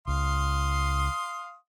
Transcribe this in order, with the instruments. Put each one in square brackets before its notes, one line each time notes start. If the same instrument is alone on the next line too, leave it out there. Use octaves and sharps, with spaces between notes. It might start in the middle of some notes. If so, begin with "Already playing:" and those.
[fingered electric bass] C#2 [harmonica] F5 C6 D#6